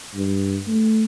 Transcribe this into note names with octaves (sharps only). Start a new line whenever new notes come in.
G2
A3